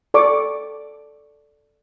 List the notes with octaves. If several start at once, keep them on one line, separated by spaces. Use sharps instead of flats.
A4 D5 C#6 D6